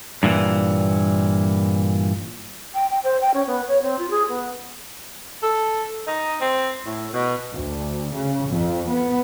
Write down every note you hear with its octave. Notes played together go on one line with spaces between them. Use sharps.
G2 A#2 E3
G5
G5
C5
G5
C#4
B3
C#5
C4
F4
G#4
B3
A4
D#4
C4
A2
B2
D2
C#3
F2
B3